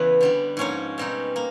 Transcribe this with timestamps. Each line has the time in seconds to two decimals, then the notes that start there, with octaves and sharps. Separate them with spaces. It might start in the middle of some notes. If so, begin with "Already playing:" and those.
Already playing: E2 C#3 E3 B4
0.21 D3 G3 B3
0.57 G#2 F3 A#3 C#4 C#5
0.98 B2 G3 C4 D#4
1.36 A#3